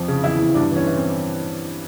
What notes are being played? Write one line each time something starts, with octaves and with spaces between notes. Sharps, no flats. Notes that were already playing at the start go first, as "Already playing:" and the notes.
Already playing: F2 F3
C#3
E2 E4
E2
G2 D4
E3 C#4
E3
C4